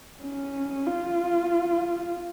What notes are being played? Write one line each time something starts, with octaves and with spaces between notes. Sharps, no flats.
C#4
F4